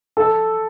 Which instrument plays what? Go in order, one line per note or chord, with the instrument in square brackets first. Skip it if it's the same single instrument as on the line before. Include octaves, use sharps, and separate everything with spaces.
[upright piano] A4